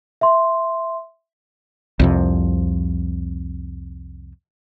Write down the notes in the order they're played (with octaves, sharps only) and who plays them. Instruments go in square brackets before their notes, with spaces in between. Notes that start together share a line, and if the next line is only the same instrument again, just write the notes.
[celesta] E5 C6
[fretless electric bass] C2 F2 C3